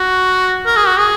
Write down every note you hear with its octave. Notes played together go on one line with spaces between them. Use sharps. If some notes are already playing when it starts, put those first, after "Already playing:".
Already playing: F#4
A#4
G#4
F#4
G#4